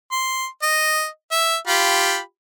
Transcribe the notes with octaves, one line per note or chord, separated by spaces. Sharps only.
C6
D#5
E5
F4 G4 B5